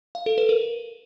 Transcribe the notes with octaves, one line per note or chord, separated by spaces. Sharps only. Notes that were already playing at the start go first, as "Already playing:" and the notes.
F5
A4
B4
A#4